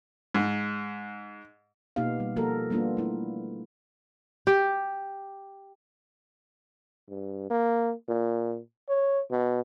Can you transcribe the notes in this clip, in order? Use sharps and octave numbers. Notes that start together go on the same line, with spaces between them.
G#2
B2 A#3 B3 D#4 G4 F5
G3
F3 A#3 F#4 G4 A4 A#4
G3 A#3 B3 D4 F4
A3 E4
G4
G2
A#3
A#2
C#5
B2